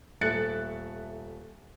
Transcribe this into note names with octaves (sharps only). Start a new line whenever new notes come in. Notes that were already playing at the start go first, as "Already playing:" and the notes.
D#1 A3 E5 F#6 A6 C#7